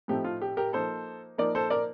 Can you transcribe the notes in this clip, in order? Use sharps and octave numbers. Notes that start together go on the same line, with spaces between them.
A2 F3 A3 C4 D#4 G4
F4
G4
G4 A#4
F3 A#3 D#4 A4 C5
F3 A#3 D#4 A#4 D5
A4 C5
A#4 D5